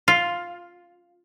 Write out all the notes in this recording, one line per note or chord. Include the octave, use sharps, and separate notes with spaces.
F4